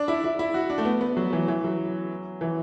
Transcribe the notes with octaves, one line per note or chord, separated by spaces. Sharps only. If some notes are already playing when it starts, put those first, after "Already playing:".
Already playing: D4
E4
E4
E4
F#4
D4
A3
B3
B3
F#3
E3
E3
F#3
E3